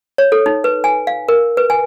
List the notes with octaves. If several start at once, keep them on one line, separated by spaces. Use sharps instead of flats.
C#5
A4
D#4
B4
G#5
F5
A#4
B4
G#5